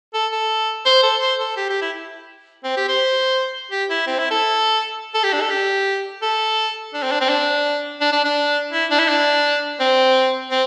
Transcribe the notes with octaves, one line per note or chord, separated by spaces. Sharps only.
A4
A4
C5
A4
C5
A4
G4
G4
E4
C4
G4
C5
G4
E4
C4
E4
A4
A4
G4
D4
A4
G4
A4
D4
C4
D4
C4
D4
D4
D4
D4
E4
D4
E4
D4
C4
C4